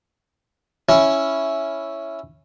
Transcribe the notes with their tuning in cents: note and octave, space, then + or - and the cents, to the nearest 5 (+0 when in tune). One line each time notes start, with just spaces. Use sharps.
C#4 +0 E4 +0